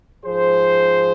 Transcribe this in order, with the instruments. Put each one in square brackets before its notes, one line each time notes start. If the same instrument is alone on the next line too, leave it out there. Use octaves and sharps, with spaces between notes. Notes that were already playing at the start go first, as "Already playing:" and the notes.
[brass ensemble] G#2 F3 G#4 C5